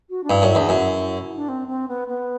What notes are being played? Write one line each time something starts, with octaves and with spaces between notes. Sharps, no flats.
F#4
D4
G2 E4
F#2
E4
E2 D4
F#2 E4
D4
C4
C4
B3
B3